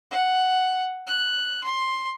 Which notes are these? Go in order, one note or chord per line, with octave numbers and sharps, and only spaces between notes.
F#5
F#6
C6